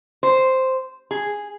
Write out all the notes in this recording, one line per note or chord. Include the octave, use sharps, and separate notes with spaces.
C5
G#4